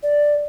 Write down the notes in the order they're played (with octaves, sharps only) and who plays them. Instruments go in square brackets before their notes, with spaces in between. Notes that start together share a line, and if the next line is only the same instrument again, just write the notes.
[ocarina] D5